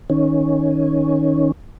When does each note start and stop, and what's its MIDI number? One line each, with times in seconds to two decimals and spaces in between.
0.10 1.52 51
0.10 1.52 61